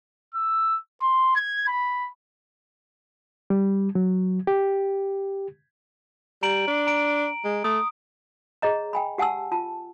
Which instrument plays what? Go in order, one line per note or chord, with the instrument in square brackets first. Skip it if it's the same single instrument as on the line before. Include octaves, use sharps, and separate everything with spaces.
[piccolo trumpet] E6
C6
G#6
B5
[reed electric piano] G3
F#3
G4
[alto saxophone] G3 [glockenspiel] A#5 D7 F#7
[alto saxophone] D4
[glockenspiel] A#5 D7
[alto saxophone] G#3
[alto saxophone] A3 [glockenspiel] D#6
[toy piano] G#4 C#5 D#5 A#5
G5 G#5 B5
G4 F#5 G#5 A5 E6
F4 A5